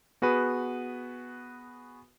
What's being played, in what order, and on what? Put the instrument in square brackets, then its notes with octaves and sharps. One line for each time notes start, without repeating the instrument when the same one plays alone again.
[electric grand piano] B3 F#4 G#4 B4